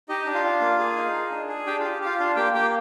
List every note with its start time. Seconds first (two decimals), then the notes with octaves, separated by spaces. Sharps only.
0.09 D#4 G4 D#5
0.26 D4
0.35 F4 F5
0.44 D4
0.61 A#3
0.79 G#4
0.96 D#4
1.14 G#4
1.31 D4
1.49 G#4
1.67 D4 G4 G5
1.79 F4 F5
1.84 G4
2.02 F4 G4 F5
2.19 D4 F4 F5
2.36 A#3 G4 G5
2.54 A#3 G4 G5